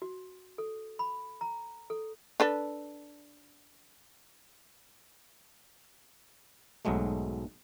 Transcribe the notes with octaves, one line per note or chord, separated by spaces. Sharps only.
F#4
A4
B5
A#5
A4
D4 A4 B4
B1 G#2 F#3 G#3 A3